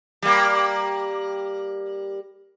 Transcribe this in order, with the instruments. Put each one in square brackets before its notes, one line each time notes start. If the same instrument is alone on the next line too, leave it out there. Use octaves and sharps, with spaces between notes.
[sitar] G3 A#3